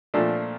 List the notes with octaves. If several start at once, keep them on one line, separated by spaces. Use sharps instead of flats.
A#2 F3 A3 D4